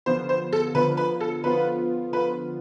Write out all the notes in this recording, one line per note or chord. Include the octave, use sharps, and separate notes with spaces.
D3 F3 B3 F4 C5
C5
A4
D3 F3 B3 F4 B4
B4
A4
D3 F3 B3 F4 B4
D3 F3 B3 F4 B4